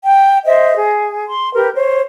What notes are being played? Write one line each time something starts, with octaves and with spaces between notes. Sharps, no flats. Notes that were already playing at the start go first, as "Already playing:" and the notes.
G5
C5 D#5 E5
G#4
C6
G4 A#4 B4
C5 C#5